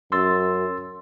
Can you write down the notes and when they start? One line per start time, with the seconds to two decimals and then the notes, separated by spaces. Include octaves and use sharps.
0.12 F#2 C6 E6 A6